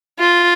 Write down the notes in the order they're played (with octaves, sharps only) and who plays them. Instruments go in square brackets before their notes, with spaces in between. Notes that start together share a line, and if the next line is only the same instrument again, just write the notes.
[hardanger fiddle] F4